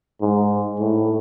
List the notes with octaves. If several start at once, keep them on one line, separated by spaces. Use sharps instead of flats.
G#2
A2